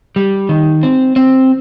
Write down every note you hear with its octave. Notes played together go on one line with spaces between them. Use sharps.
G3
D#3
C4
C4